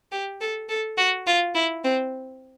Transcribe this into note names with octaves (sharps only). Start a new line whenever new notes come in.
G4
A4
A4
F#4
F4
E4
C4